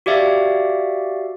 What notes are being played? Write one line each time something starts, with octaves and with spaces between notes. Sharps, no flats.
F#4 G4 D5 E5 F5